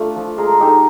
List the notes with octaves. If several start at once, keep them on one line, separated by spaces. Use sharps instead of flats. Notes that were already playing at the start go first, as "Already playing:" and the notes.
Already playing: A3 D4 F4 A4
F3
G#3 G#4 A#4
D#4 G4 A4